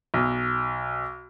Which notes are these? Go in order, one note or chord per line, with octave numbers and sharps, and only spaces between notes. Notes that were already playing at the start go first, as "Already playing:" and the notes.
B1